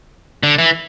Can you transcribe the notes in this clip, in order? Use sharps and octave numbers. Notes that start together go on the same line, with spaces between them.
D3
E3